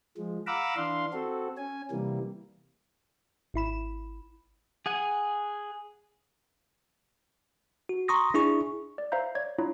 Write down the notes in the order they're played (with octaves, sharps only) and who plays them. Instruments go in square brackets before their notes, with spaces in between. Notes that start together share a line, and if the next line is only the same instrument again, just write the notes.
[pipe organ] F3 G#3
F5 F#5 A#5 B5 D6 E6
E3 D4 F5 C6
C4 F#4 A4
C#4 G#5
C3 E3 G3 A#3
[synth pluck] G#1 E4 B5 E7
[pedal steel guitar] G#4 F#5 G#5
[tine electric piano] F#4
A#5 C6 C#6 D#6 A#6
D4 E4 G#4 C#6
[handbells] D5
C5 E5 F5 A#5 G6
C#5 D5 G#6
D4 E4 F4 C#5 A#5